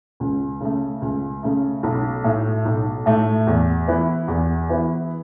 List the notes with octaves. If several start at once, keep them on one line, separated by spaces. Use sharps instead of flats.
C#2
C#3 A3
C#2
C#3 A3
B1
A2 A3
B1
A2 A3
E2
E3 B3 E4
E2
E3 B3 E4